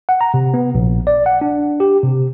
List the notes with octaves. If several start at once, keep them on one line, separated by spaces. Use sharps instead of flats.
F#5
A#5
C3
B3
A#1
D5
F#5
D4
G4
C3